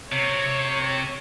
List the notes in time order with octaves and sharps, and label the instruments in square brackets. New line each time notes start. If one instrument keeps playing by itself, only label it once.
[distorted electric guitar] C3 [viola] C#5